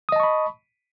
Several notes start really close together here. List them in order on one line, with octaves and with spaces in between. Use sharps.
D#6 D#5 A5 C#6 B5